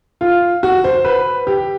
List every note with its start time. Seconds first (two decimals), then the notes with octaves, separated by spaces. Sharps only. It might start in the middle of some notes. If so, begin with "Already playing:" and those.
0.21 F4
0.63 F#4
0.84 C5
1.05 B4
1.47 G4